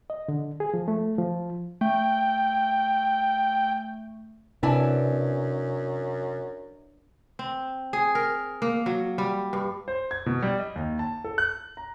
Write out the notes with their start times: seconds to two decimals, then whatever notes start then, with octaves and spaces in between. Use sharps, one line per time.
0.10 D#5
0.28 D3
0.60 G#4
0.74 F3
0.88 A3
1.18 F3
1.81 A3 G5
4.63 F#2 C3 B3 D4 E4 D5 G#5 A5
7.39 C4
7.93 G#4
8.15 A#4
8.62 A#3
8.86 F#3
9.18 G3
9.53 G2
9.88 C5
10.11 G#6
10.26 B2
10.42 G3
10.60 D#5
10.76 D#2
10.99 A5
11.25 A4
11.38 F#6
11.77 A#5